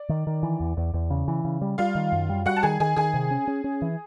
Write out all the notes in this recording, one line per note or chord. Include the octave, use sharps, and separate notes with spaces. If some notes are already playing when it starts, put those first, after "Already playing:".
Already playing: D5
D#3
D#3
E3
E2
E2
E2
C#3
E3
C#3
G3
G3 F4 F5
D#3
F#2
G3
G3 F#4 F#5
A5
D#3 G#4 G#5
D#3 G#4 G#5
D#3 G#4 G#5
C3
C#4
C#4
C#4
E3